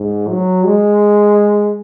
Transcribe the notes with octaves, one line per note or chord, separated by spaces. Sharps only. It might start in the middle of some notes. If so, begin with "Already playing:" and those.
Already playing: G#2
F#3
G#3